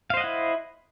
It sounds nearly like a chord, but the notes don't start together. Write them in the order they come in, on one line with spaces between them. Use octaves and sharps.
F5 C5 D#5 F#5 E4